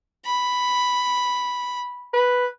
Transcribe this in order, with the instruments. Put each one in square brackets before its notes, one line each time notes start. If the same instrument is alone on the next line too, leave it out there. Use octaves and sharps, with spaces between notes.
[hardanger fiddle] B5
[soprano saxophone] B4